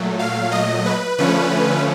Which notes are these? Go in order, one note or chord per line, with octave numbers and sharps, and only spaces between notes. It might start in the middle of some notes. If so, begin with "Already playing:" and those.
Already playing: A#2 F#3 A3
F5
D#5
B4
D3 F3 A3 C#4 B4